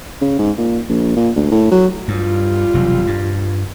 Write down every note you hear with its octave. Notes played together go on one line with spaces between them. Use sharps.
C#3
G#2
A#2
A#1
A#2
D2
A2
F#3
G2 G3 F4
E1 C3 F#3
G2